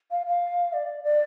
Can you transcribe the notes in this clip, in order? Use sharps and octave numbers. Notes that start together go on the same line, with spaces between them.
F5
F5
D5
D5